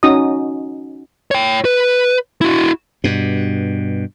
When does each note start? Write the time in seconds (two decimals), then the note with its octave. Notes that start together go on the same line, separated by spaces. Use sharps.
0.03 C#4 D#4 F#4 D#6
1.31 C#5 G5
1.65 B4
2.41 E4 F#4
3.04 G2 B2